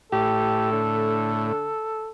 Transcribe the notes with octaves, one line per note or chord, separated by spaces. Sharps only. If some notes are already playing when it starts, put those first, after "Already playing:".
A2 G4 A4
D3